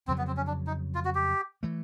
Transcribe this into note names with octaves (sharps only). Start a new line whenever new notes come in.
F2 C#3 F#3 C4
B3
C4
C#4
D4
D#4
F4
F#4
G4
E3 A3